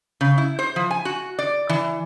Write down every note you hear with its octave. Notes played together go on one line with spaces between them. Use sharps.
C#3
E4
C5
F3
G#5
F#4
D5
E3